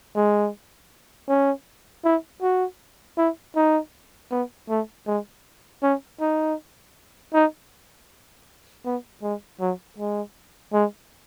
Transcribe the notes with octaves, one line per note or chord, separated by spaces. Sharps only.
G#3
C#4
E4
F#4
E4
D#4
B3
A3
G#3
C#4
D#4
D#4
B3
G#3
F#3
G#3
G#3